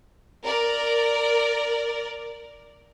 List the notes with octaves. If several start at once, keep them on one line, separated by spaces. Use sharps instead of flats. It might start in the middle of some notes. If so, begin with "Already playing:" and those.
A#4 D5